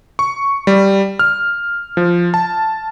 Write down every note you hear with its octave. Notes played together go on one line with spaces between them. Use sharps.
C#6
G3
F6
F3
A5